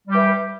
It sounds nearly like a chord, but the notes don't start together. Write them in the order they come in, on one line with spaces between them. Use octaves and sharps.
G3 G4 E3